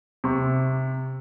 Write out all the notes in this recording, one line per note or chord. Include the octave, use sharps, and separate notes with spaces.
C3 C#6